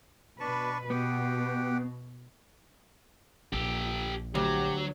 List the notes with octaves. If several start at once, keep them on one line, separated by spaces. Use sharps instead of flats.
B2 D4 B4 A5 C#6
B2 B3 G4 F#5 G5
A#1 G4 A4
D2 F#3 G4